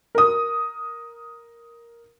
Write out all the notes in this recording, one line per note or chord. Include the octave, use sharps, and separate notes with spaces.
A#4 D#6